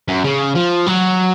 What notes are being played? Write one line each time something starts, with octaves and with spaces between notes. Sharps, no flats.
F#2
C#3
F3
F#3